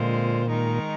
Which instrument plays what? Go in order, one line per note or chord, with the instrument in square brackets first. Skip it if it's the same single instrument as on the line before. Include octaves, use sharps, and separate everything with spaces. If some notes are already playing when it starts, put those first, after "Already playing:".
Already playing: [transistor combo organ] A#2 [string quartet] D3 G#3 C4 F4 C5
[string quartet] D#3 G#3 D#4 A#4